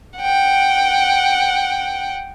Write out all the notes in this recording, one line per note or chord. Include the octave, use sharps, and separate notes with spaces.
F#5 G5